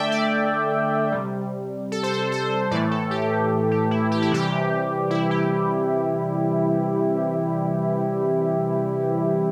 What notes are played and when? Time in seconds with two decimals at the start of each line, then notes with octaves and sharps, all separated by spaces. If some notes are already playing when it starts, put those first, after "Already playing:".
Already playing: D3 A3 D5 E5 G5
0.12 D5
1.12 C3 G3
1.92 A4
2.03 C5
2.13 A4
2.32 C5
2.71 A2 E3 A3 D5
2.91 A4
3.11 G4
3.71 G4
3.91 E4
4.12 G4
4.22 E4
4.31 C3 E3 G3 G4
5.11 E4
5.31 G4